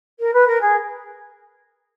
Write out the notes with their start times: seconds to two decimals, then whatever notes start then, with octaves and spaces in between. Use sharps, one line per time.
0.19 A#4
0.33 B4
0.47 A#4
0.61 G#4